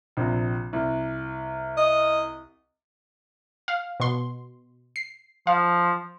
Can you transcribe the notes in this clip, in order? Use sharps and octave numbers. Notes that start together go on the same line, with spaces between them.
A#1 C3
C2
D#5
F5
B2 C6
C7
F3 F5